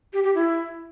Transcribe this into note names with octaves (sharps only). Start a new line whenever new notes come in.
G4
G4
E4